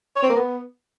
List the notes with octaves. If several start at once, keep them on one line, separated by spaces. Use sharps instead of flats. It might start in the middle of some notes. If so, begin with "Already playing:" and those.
C#5
C4
A#3
B3